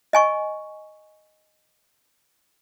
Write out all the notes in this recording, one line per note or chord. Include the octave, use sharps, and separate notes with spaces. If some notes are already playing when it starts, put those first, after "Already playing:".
D#5 G#5 C#6